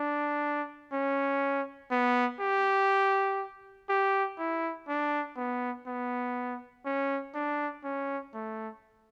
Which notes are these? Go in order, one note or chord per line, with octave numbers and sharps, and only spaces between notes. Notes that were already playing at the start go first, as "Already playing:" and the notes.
Already playing: D4
C#4
B3
G4
G4
E4
D4
B3
B3
C#4
D4
C#4
A3